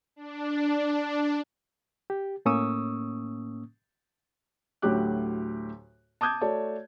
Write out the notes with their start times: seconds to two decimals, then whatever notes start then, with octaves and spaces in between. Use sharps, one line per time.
0.16 D4
2.10 G4
2.45 A2 A#3 C#4 C#6 D#6 E6
4.82 D2 A2 F#3 G4 D6 F#6
6.21 A5 D6 D#6 G6 G#6
6.41 A3 F#4 C#5 D5 A5